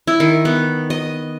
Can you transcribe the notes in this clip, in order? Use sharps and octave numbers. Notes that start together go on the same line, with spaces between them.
E4
D#3
B3
D#5